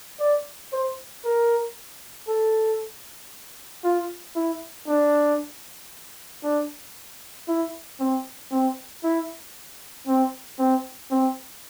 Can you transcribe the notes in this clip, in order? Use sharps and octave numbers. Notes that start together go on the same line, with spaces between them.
D5
C5
A#4
A4
F4
E4
D4
D4
E4
C4
C4
E4
C4
C4
C4